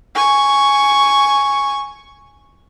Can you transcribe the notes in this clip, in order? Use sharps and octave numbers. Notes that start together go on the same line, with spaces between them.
G#5 C#6